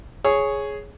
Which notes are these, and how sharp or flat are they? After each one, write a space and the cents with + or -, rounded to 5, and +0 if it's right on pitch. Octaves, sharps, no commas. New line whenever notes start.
G#4 +5 C#5 +0